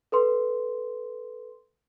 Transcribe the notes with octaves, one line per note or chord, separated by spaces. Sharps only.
A4 B4 C6